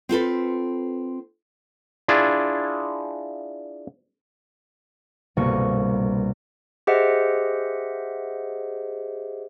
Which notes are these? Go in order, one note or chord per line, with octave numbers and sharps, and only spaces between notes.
C4 F4 A4 B4
D4 E4 F4 G#4
G1 C2 B2 A#3 B3 C#6
G4 G#4 C5 D#5 E5 F#5